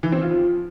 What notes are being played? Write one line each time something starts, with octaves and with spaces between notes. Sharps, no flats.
E3
C4
F4
F3